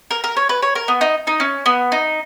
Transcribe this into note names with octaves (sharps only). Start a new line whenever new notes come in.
A#4
A#4
C#5
B4
C#5
A#4
B3
D#4
D#4
C#4
B3
D#4